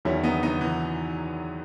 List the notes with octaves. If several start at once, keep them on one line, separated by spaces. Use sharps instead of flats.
E2 D#3 F#3 C#4 E4
B3 D#4
B3 D#4
E3